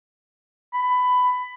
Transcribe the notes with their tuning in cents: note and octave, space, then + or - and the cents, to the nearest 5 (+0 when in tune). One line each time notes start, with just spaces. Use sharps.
B5 +15